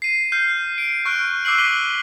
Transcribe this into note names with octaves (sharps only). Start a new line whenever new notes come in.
C7 D#7
F6 G6 C7
D7
C#6 F6 F#6 D7
D6 E6 F#6 C7 F#7
D6 B6 D#7 F#7 G7